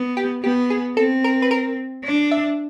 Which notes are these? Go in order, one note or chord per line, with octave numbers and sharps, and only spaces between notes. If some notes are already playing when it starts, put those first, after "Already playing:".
Already playing: B3
G4
B3 G4
G#4
C4 A4
A#4
B4
A#4
D4
E5